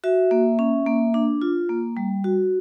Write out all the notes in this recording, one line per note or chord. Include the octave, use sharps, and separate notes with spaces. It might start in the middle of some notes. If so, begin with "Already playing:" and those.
F#4 E5
A#3
C#4
A#3
D4
F4
A#3
G3
F#4